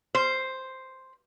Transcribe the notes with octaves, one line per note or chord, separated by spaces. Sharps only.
C5